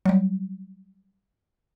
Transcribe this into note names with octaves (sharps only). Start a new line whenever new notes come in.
F#3 G3